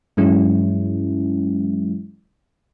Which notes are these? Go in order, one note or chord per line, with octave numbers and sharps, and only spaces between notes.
G2 E3 F#3 G#3 C#4 E4